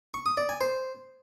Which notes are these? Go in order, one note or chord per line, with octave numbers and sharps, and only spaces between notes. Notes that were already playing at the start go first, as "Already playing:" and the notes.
C#6
D#6
D5
G#5
C5